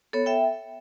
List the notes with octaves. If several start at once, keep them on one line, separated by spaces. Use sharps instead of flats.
B3 A4 C#5
E5 G5